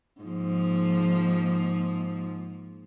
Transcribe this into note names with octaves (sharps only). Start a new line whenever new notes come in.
G#2 F3 A#3